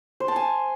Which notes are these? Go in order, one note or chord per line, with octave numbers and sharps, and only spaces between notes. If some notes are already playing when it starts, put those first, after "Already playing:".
C5
A5
G#5